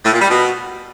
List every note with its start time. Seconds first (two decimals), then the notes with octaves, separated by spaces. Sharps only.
0.04 A2
0.13 A#2
0.21 G3
0.30 B2